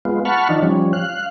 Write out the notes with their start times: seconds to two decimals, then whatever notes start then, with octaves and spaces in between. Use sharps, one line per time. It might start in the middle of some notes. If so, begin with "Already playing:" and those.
0.05 G#3 B3 F4
0.25 F#5 A5 B5 C#6 F6
0.49 D#3 F3 D4 D#4
0.63 F3 G3 C#4
0.93 F5 F#6